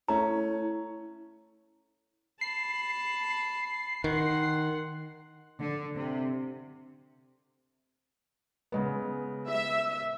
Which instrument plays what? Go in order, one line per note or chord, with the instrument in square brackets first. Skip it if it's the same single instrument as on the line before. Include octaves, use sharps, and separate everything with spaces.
[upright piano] A3 C#4 [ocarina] E4 [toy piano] A#5
[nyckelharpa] A5 B5 [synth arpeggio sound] C7
[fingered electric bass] D#3 [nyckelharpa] F#5 C6
[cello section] D3
C3
[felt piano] C#3 G#3 B3
[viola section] E5